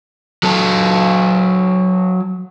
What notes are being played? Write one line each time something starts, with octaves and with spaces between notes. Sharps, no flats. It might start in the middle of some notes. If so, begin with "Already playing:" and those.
F#3 A4